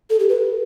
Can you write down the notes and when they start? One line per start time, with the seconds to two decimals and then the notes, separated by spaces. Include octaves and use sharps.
0.10 A4
0.20 G4
0.29 B4